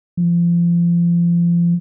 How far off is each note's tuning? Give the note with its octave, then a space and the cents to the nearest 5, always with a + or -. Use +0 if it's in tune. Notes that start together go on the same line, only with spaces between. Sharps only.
F3 -30